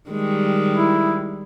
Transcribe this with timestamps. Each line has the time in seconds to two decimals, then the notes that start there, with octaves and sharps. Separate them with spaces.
0.10 D#3 G3 G#3
0.76 E4